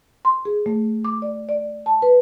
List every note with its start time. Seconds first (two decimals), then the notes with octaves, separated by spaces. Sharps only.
0.25 C6
0.45 G#4
0.66 A3
1.05 D6
1.22 D5
1.49 D5
1.86 A5
2.02 B4